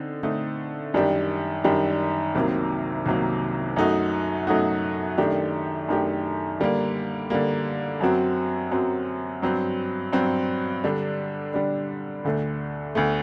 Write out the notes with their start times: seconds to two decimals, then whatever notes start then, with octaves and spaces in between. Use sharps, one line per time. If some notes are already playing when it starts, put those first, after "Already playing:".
Already playing: D3 C4 D#4
0.23 D3 A3 C4 D#4
0.94 F#2 D#3 G3 D4 G4
1.64 F#2 D#3 G3 D4 G4
2.35 C2 C3 D#3 F#3 A#3
3.06 C2 C3 D#3 F#3 A#3
3.76 F#2 F#3 A3 D#4 F#4
4.47 F#2 F#3 A3 D#4 F#4
5.18 F#2 D#3 A3 D4 G4
5.89 F#2 D#3 A3 D4 G4
6.60 D3 G3 A#3
7.30 D3 G3 A#3
8.00 F#2 F#3 C4 F#4
8.72 F#2 F#3 C4 F#4
9.42 G2 F#3 C4
10.13 G2 F#3 C4
10.84 D3 G3 D4
11.54 D3 G3 D4
12.24 D2 D3 A3
12.95 D2 D3 A3